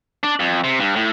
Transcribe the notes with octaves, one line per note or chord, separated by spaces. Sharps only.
D4
F2
C3
G2
A2